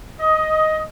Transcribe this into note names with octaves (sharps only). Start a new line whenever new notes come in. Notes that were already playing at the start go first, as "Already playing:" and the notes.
D#5